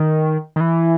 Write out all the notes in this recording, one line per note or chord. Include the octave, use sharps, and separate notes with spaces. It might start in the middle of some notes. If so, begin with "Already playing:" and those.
Already playing: D#3
D#3
E3